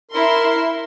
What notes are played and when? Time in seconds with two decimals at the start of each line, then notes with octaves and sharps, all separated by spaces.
0.11 E4 A#4 E5 C6